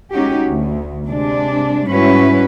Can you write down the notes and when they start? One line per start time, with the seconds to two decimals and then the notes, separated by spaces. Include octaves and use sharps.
0.12 G#3 C#4 D#4 F#4 G4
0.46 D2
1.05 C3 G#3 D4
1.89 G#2 G3 C#4 E4 F#4 B4